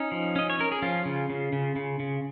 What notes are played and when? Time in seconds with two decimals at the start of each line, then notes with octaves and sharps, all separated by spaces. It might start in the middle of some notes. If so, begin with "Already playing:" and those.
Already playing: C#4 D#4
0.12 F3
0.36 C#4 D#5
0.50 C#5
0.59 C#4 A#4
0.72 G#4
0.82 F3 C#4 F4
1.06 C#3
1.30 C#3
1.53 C#3
1.76 C#3
2.00 C#3